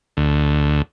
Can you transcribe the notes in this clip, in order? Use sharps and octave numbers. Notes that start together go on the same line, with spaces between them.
D2